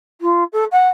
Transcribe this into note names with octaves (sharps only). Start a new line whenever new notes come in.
F4
A4
F#5